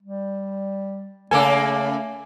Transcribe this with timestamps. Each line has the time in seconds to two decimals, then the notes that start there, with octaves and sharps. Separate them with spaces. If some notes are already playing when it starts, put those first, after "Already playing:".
0.02 G3
1.31 C#3 A3 A#3 A4 G#5 D6